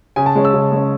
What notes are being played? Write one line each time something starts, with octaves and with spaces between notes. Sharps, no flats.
C#3 G#5
A5
G#3 C#4
E6
C#3
G#3 C#4